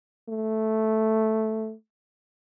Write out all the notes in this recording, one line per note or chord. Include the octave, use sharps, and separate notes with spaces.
A3